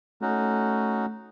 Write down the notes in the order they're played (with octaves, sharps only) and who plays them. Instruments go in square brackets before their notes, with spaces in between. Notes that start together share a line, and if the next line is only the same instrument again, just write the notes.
[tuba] A3 [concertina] C#4 D#4 F#4